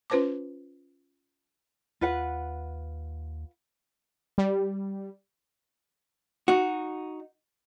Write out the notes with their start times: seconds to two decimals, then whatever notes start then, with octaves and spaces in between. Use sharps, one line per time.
0.10 C#4 F4 B4 C5 A5 D6
2.01 D#2 F4 B4 F#5
4.38 G3
6.48 D#4 F#4